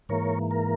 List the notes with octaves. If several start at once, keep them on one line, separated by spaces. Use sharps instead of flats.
G#2 E3 A#3 A#4 C#5
A#4